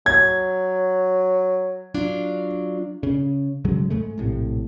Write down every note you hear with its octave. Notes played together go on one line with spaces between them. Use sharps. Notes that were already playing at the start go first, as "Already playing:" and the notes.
F#3 G#6
F#3 D4 F4
C#3
G#1 C#3 F#3 G#3
G#2 G#3 A3
A#1 A2 C3